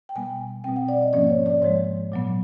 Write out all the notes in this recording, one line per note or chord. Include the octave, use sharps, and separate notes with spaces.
G5
B2 G3 B3 G#5
B2 G3 C4 G5
F#5
D5
D#5
G#2 F3 A#3 C#4 D5
C#5
D5
G#2 F3 G#3 C#5
A#2 F#3 B3